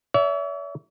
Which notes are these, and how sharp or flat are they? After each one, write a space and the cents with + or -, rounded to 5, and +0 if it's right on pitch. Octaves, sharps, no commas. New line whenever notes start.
C#5 +45 E5 +0